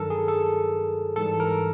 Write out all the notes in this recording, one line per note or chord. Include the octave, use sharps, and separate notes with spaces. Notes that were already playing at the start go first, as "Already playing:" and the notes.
Already playing: G2 D#3 F#3 A4 A#4
G#4
A4
G#2 E3 G3 A4
A#4